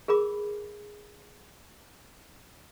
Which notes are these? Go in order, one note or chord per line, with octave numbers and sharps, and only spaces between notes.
G#4 A#4 B5 D6